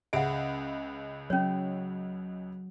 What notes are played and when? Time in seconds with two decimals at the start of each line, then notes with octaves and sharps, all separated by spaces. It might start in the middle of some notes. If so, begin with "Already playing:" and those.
0.13 C#2 C#3 E5 F#5 D7
1.30 F#3 C#4 C#5